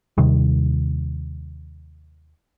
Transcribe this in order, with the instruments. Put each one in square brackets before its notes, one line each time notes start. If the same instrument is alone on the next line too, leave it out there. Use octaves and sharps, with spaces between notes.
[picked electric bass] D#2 C3 D#3 G3